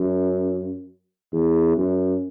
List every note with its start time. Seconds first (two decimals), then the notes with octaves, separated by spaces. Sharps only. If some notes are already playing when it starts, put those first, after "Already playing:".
Already playing: F#2
1.33 E2
1.76 F#2